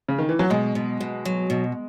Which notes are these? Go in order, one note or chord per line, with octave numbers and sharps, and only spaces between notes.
C#3
D#3
E3
F#3
B2 G#3
B2
B2
F#3
B2